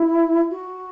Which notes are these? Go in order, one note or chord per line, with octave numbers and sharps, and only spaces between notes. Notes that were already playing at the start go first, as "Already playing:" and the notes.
Already playing: E4
F#4